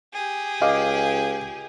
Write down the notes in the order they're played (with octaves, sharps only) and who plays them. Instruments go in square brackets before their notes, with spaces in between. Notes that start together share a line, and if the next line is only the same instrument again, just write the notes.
[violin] G4 G#4
[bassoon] C#2 [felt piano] D#5 F5 D6